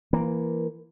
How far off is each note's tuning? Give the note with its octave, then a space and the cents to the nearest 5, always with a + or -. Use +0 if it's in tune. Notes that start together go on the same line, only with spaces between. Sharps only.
E3 +15 A#3 +0